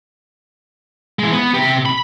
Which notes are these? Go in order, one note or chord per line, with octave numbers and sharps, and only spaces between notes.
E3 G#3
B3
C3 G4
B5